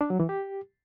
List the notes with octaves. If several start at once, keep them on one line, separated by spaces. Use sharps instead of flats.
D4
F#3
E3
G4